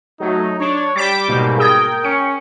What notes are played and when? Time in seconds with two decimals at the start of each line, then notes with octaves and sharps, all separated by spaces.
0.20 F#3 A3 D#4
0.60 D4 C#5
0.96 G3 G5 D6 A6 B6 E7
1.28 G#2 B2 A#3
1.58 G#4 A#4 G5 D#6 G#6
2.05 C#4 C#7